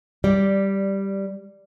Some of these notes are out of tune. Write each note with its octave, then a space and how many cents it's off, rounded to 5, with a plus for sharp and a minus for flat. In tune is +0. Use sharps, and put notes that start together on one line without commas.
G3 +0 D5 -5